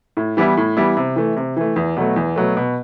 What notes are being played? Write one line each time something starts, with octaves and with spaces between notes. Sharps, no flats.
A2
E3 G3 B3 E4
A2
E3 G3 B3 E4
C3
E3 A3
C3
E3 A3
E2
B2 F#3 A3
E2
B2 F#3 A3
B2